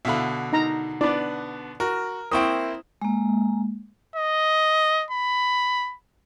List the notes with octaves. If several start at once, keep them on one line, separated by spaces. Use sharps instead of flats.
B2 D3 E5 F5 B5
D#4 A#5
B3 D4 D5
F#4 A#4
A#3 C4 E4 G5 C#6 D#6
G#3 A#3
D#5
B5